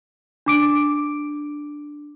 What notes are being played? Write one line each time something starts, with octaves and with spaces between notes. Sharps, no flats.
D4 D6 D7